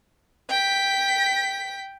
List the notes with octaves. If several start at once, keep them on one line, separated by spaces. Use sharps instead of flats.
G5 B6